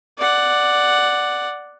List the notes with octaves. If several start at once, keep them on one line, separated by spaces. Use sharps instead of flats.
D5 F#5